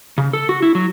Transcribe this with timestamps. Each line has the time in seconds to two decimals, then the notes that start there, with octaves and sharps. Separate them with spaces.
0.18 C#3
0.33 A4
0.49 F#4
0.62 E4
0.75 F#3